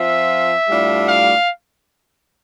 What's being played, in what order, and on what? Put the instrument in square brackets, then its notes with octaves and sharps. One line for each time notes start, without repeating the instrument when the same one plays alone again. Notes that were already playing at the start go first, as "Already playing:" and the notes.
Already playing: [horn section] F3 C4 F4 E5
A2 G3 D4 F4
F5